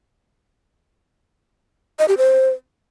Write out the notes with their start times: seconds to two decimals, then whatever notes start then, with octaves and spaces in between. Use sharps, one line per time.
1.99 D#5
2.08 G4
2.18 C5